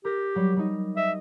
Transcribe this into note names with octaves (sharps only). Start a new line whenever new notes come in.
G4 A#4 A#6
F#3 G3
G3 D#4
D#5 E5